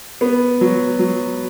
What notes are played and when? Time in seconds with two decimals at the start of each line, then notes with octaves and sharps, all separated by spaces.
0.21 B3
0.61 F#3
0.99 F#3